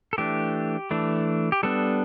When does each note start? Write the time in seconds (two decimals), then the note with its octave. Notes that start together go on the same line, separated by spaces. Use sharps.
0.13 A4
0.18 E3 A3 D4 G4
0.91 E3 A3 D4
1.52 G4
1.63 G3 B3 D4 A4